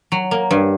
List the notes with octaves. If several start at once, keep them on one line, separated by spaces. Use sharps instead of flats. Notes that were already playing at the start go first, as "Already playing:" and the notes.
F#3
A#3
G2